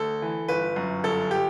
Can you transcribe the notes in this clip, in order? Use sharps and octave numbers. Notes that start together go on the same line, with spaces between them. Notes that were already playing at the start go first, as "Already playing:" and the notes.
Already playing: D2 A4
E3
G1 B4
F#2
G1 A4
G4